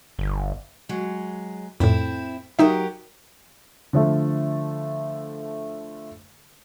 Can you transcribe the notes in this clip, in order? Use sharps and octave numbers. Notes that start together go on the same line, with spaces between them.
G1
F#3 G#3
F2 A2 C4 E4
F#3 D#4 G4 A#4 E5
D3 F3 A3